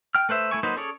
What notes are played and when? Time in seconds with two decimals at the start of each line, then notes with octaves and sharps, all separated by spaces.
0.15 G5 F6
0.29 A3 B4 C5 E5
0.51 A3 E4 G#5 C#6
0.63 F#3 A#3 D#4 B4 C5
0.76 C#4 G#4 A4 C#5 D5